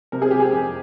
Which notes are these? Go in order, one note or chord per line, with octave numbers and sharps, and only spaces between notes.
C3 A#4
G#4
C3 G4
G#4
F2